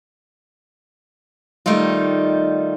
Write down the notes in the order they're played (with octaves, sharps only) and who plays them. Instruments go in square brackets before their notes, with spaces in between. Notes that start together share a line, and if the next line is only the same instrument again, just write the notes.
[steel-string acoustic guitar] D#3 G3 A3 D#4 F4